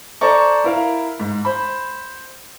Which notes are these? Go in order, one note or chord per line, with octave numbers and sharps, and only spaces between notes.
A4 C5 D5 A#5 C#6
E4 A#4 F5
G#2
C5 B5